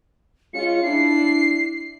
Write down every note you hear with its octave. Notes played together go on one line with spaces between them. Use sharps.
G#3 C#4 F4 C#7
D4 E4 C7